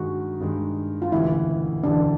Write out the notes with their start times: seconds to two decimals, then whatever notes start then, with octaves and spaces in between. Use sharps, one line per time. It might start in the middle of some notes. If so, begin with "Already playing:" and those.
Already playing: G2 D#3 G#3 F#4
0.40 G2 D#3 G#3
1.02 F4
1.12 E1 D2 C#3 E3 G3 E4
1.83 E1 D2 C#3 E3 G3 D4